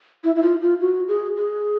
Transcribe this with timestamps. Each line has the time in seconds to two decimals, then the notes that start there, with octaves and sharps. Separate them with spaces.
0.24 E4
0.36 E4
0.43 F4
0.61 F4
0.81 F#4
1.08 G#4
1.37 G#4